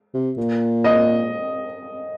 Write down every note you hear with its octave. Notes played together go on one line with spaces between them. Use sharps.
C3
A#2
D#5